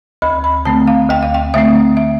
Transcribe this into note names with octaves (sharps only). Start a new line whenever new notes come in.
D2 B5
B5
D3 A3 C4 A5
F5
D2 G5
F5
G5
D3 A3 C4 E5
E5